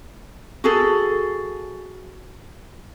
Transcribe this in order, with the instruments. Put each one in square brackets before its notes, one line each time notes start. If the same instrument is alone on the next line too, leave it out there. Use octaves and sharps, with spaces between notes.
[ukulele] F#4 G#4 A4